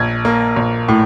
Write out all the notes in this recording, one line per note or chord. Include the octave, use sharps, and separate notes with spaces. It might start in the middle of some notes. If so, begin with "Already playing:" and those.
Already playing: A#1 G#6
A#3
A#1
A2